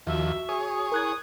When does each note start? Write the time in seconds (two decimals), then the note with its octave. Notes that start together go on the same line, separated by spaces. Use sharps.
0.07 D#2 F3 F#4 E5
0.49 G#4 C#5 D#6
0.92 E4 A#4 D#6 F#6 G#6